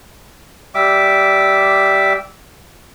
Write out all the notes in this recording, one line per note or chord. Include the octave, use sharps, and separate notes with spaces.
G3 E5 D6